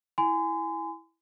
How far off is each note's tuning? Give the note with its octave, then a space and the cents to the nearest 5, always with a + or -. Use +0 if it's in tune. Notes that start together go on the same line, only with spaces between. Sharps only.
E4 +0 G#5 +0 C6 -40